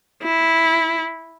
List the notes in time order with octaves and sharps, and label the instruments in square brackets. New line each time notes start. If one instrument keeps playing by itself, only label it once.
[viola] E4